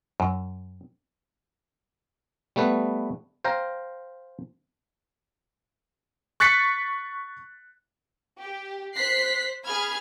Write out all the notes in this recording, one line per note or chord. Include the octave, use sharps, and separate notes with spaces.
F#2
G3 A3 B3 B4
C5 F5 G5 A#5
C#6 F#6 A6 B6 C#7
G4
C5 F#6 B6 C7
G#4 B5 F6 G#6